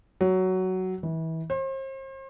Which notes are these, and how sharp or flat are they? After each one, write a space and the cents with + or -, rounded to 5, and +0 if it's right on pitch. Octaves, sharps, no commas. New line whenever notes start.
F#3 +10
E3 -30
C5 +40